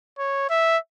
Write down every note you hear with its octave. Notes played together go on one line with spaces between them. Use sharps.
C#5
E5